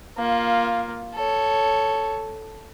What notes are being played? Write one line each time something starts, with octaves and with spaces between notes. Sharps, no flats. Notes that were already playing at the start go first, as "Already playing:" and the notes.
A#3 F4
A4 C#5